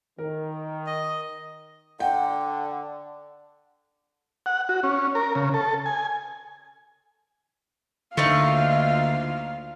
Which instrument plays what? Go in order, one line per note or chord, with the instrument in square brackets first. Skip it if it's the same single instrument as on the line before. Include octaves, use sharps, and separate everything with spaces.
[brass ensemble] D#3 [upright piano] A#4
[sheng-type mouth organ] D#5
[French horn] D3 [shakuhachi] F#5 [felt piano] G5
[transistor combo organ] F#5
F#4
C#4
A#4
C#3
A4
G#5
[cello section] D2 A#3 F4 [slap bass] D3 [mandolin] A3 D#4 [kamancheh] F5